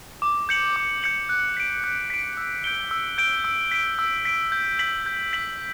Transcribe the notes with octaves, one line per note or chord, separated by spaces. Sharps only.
D6
G6 C#7 F#7
D6
G6 C#7 F#7
F#6
B6 D7
F#6
B6 D7
E6
G6 D7 G7
E6
G6 D7 G7
E6
B6 D7
E6
B6 D7
G6
B6 F#7
G6
B6 F#7